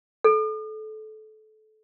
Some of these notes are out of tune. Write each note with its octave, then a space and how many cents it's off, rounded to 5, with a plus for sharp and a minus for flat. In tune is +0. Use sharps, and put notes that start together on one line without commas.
A4 -25